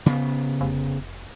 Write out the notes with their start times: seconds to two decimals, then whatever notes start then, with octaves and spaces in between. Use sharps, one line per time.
0.06 C#3 B3
0.61 F1